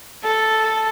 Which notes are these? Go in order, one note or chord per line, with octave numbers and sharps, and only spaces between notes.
A4